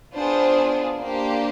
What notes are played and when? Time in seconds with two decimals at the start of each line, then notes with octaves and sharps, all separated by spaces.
0.14 B3 D4 F4 G#4 C5
1.00 A#3 D4 G4 C5